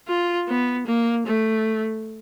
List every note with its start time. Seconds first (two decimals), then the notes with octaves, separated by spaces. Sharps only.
0.08 F4
0.48 B3
0.87 A#3
1.26 A3